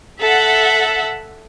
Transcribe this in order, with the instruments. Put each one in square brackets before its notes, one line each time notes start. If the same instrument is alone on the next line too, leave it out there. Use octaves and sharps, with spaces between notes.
[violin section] A4 E5 F#5